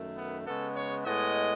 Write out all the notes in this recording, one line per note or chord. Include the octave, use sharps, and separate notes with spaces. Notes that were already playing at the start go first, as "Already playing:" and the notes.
Already playing: F#2 D#3 A3
B3
C#3 G#3 B3 A4
C#5
A2 G#3 B3 D#5